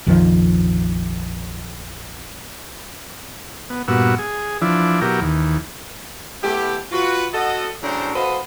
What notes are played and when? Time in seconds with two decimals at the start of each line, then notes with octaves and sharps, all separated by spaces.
0.06 A#1 F2 D#3 F3
3.70 B3
3.88 G2 A#2 B3 F#4 E6
4.19 G#4
4.62 E3 F3 D4 E4
5.01 B2 F#3 E4 G4 A#4
5.21 D#2 E3
6.43 A3 B3 E4 G4
6.92 F4 F#4 B4
7.34 F#4 A4 D#5
7.83 A2 C#3 F#3 D4 C5 A#5
8.15 F#4 A4 B4 C5 D#5 F5